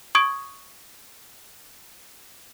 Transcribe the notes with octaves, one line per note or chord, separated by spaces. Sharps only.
C#6 D#6 G#6 D7